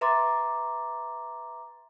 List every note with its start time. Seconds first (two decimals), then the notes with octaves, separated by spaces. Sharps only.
0.01 B4 E5 A#5 C6 D6 A6